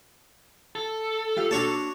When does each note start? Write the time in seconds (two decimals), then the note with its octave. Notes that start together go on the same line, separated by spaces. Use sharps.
0.75 A4
1.37 F4 G4 F5
1.51 A#3 D4 F#4 C#5 A5